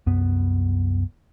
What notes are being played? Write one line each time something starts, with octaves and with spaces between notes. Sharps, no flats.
C2 F#2 B3